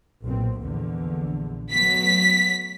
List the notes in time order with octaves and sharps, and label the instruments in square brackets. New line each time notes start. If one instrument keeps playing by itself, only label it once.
[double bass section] B1 A#2 C4
A#1 E2 D3
[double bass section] F#3 A3 B3 [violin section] B6